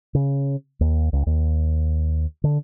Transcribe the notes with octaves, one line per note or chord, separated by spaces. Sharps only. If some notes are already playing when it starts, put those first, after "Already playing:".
C#3
D#2
C#2
D#2
D3